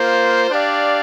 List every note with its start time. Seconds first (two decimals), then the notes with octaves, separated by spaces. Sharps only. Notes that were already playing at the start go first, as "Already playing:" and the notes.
Already playing: A#3 F4 C5
0.51 D4 G4 D5 F5